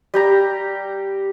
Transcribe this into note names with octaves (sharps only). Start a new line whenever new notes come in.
G3 G4 A#5